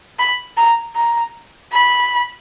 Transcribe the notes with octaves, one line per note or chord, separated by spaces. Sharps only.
B5
A#5
A#5
B5